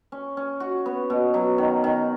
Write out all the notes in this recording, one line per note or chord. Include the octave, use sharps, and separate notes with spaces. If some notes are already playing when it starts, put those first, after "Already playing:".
C#4
C#4
F#4
B3
B2
F#3
D#3
D#3